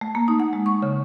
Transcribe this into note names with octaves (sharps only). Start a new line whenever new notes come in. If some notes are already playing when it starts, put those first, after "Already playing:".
A3
A#3
D#4
F#5
G#3
C#6
C#3